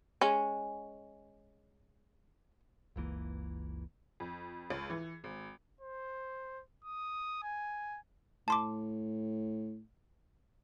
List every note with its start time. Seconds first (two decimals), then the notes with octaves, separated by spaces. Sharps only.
0.21 G#3 C#4
2.96 F#1 C#2 E3 A#3
4.20 F2
4.70 C#2
4.90 E3
5.24 G#1
5.81 C5
6.84 D#6
7.43 G#5
8.48 A2 A5 C6 D6